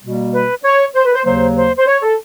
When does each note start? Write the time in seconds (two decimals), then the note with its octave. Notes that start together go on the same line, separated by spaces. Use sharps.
0.02 B2 G3 A#3
0.33 B4
0.63 C#5
0.94 C5
1.04 B4
1.14 C5
1.25 D#2 C#3 F#3 A#3 C5
1.57 C5
1.77 C5
1.87 C#5
2.03 A4